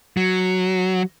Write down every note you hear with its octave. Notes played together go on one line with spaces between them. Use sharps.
F#3